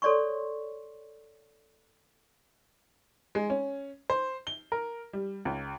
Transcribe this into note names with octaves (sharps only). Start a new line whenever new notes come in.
A4 C#5 D5 C6 C#6
G#3
C#4
C5
G7
A#4
G3
C#2